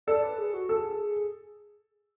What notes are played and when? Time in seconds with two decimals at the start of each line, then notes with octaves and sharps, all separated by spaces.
0.07 A4 D5
0.23 B4
0.38 G#4
0.54 F#4
0.69 G#4 A4